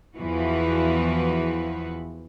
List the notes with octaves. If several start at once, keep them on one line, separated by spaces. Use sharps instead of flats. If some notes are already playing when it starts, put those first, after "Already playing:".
E2 E3 F3 F#4 B4